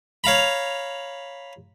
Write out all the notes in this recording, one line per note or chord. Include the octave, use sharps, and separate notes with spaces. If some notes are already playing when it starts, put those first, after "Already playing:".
C#5 F5 A#5 B5